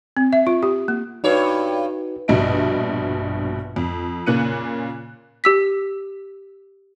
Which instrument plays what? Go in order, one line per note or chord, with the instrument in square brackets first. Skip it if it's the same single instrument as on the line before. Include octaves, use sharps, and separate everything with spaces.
[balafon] C4
E5
F4
G4
A#3
[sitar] G2 C#5 [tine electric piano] D#4 F#4 B4
[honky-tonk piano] A#1 G2 B2 D#5 E5 D7
F2
A#2 C#3 A#3 F#6 C#7 D#7
[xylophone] G4 E6 B6